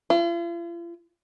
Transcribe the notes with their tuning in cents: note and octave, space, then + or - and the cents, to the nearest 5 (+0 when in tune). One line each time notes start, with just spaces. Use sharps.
F4 -45